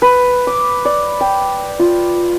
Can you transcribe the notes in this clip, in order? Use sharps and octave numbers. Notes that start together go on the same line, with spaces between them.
B4
D6
D5
G5
F4